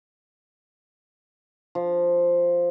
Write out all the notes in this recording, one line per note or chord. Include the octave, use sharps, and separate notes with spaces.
F3